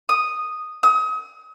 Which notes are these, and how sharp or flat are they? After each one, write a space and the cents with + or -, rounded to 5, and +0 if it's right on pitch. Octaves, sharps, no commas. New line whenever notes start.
D#6 -5
D#6 +35